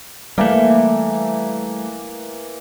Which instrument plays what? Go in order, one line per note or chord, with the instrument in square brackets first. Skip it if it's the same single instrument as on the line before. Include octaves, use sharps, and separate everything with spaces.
[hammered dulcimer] E3 A#3 [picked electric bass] G3 A3